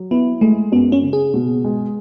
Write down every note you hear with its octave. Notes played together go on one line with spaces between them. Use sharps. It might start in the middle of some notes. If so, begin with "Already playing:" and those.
Already playing: F#3
B3 E4
G#3 A3
F#2 B3
C#4
C#3
G#4
B2
G#3